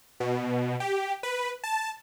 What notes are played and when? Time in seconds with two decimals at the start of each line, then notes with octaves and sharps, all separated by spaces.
0.20 B2
0.80 G4
1.23 B4
1.64 A5